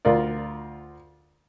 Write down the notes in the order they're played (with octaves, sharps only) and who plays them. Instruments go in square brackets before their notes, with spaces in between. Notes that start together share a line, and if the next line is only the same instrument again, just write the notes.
[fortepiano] D2 F4 A#4 D5